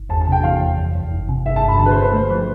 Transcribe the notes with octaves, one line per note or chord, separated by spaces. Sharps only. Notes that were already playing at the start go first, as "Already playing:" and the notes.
Already playing: G1
E2 A5
A5
C3 G5
E3 F5
E2
F2
F2
G1
C3
G1 E5
A5
G2
B5
D3 A5
B4
C5
D3
B4
A3 C5
F3 B4